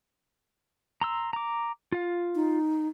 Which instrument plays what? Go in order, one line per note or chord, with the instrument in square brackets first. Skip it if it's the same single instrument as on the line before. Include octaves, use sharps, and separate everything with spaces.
[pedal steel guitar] A#5 C6 E6
A#5 D6
F4 F5
[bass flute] D#4